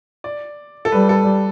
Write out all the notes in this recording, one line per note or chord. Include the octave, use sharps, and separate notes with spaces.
D5
A4
G3 B4
A4